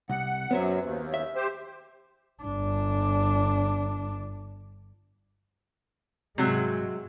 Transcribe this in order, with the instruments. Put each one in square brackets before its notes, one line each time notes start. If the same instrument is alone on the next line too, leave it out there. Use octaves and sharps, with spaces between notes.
[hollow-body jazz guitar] C2 [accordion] F#5
[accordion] F#2 F#3 [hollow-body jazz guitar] B3 C5 E5
[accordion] D#2
[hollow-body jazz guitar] E5
[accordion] G4 C5
[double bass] G1 D4
[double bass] G#2 G#3 [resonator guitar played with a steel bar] C3 F#3